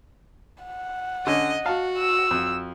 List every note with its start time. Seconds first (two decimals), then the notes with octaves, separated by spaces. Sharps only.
0.64 F#5
1.27 D3 C#4 D#5
1.66 F#4 F5 A5
1.98 E6
2.31 F2